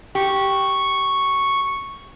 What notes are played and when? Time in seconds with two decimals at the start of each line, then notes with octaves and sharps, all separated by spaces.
0.15 G4 C#6